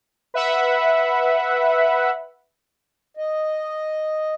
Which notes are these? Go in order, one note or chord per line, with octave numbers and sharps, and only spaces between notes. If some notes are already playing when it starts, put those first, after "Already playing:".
B4 E5 F#5 B5
D#5